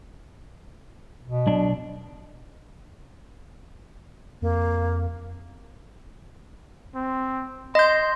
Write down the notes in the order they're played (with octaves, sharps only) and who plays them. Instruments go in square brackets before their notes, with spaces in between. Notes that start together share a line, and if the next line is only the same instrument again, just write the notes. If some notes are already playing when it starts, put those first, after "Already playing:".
[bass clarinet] B2
[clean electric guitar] B1 D4
[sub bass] F2 [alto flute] A#3
[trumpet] C4
[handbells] D#5 G6 [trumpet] C6